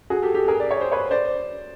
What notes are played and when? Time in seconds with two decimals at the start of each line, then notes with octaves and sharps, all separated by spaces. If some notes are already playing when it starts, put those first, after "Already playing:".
0.10 F#4 G#4
0.22 G4 A4
0.35 G4 A4
0.48 G#4 A#4
0.60 D5
0.71 C#5
0.81 C5
0.92 B4 C#5
1.11 C5 D5